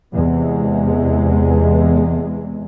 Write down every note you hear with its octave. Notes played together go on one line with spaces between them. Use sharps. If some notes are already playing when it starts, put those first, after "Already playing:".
E2 C3 G#3